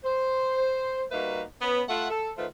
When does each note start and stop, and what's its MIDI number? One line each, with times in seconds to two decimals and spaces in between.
0.04 1.04 72
1.12 1.42 55
1.12 1.42 58
1.12 1.42 63
1.12 1.42 66
1.12 1.42 71
1.12 1.42 76
1.61 1.82 59
1.61 1.82 61
1.89 2.07 57
1.89 2.07 65
1.89 2.07 76
1.89 2.07 78
2.11 2.31 69
2.38 2.46 51
2.38 2.46 57
2.38 2.46 65
2.38 2.46 71
2.38 2.46 72